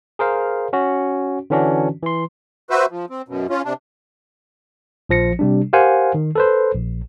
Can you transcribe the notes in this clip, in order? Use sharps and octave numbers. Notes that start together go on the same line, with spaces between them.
G#4 A#4 C5 F5
C#4 F#4
D3 E3 C#4 D4 F#4
E3 C6
F#4 B4 C5 E5
F3
C4
F#2 B2
C#4 F4
C3 D4
A#1 F3 A#6 C#7
C3 G3 D4
G4 A#4 C5 F5 F#5 G#5
D#3
A4 B4 C5
A#1